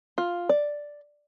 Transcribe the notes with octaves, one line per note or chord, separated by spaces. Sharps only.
F4
D5